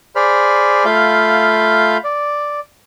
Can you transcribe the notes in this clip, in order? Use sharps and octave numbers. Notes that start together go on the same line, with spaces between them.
G#4 C5 D5 B5 F6
A3 F4 F5 B5 G6
D5